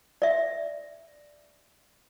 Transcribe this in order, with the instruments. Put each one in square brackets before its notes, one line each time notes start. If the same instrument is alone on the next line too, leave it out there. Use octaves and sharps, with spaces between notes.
[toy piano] D5 E5